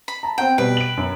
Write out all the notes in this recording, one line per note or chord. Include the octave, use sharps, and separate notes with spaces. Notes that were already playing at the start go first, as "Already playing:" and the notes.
B5
A5 A#5
C4 F#5 G5
B2 G3 B4 D7
D7 F#7
F#2